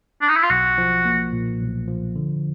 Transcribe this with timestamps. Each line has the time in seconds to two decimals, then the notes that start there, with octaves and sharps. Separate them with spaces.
0.22 D4
0.29 D#4
0.36 E4
0.43 F4
0.50 B1 F#4
0.78 F3
1.05 A#3
1.33 A#2
1.60 B1
1.88 F3
2.16 D3